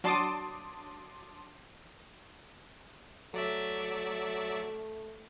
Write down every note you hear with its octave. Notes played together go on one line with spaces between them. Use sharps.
F#3 D4 A5 C6 D6 D#6
F#3 A3 D5 E5